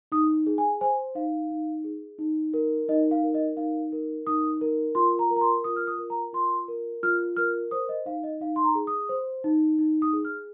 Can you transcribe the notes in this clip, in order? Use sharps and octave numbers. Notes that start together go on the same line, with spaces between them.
D#4 D#6
G#4
G#5
C5 G#5
D#4 F5
D#4
G#4
D#4
A#4
D#4 D#5
F5
A#4
D#5
D#4 F5
A#4
D#4 D#6
A#4
F4 C6
A#5
A#4
A#5
C6
F4 D#6
F6
D#6
A#4
A#5
F4 C6
A#4
F4 F6
A#4 F6
C5 D#6
D#5
D#4 F5
D#5
D#4 F5
C6
A#5
G#4
D#6
C5
D#4
D#4
D#6
G#4
F6